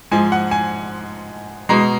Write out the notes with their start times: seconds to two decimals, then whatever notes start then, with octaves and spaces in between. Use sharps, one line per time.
0.11 G#2 F3 G#3 G#5
0.32 F#5
0.51 G#5
1.69 B2 G#3 A#5